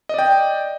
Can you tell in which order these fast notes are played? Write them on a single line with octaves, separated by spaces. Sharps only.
D#5 D5 G5